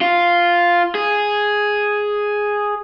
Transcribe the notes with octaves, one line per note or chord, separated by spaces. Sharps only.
F4
G#4